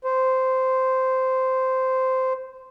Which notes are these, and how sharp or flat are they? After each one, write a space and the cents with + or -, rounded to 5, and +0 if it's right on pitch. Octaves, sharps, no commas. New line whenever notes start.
C5 -10